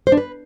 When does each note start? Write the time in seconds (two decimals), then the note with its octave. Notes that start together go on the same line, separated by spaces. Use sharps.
0.07 C5
0.12 D4
0.17 B4